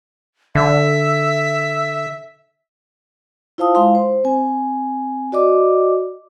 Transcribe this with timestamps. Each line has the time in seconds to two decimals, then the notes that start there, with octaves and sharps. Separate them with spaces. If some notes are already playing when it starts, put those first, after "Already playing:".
0.55 D3 E5
3.58 E4 F4 C5 F5 A5 D#6
3.75 G#3 E4 F5 C6
3.95 C5
4.24 C4 G#5
5.32 F#4 D5 D#5 D6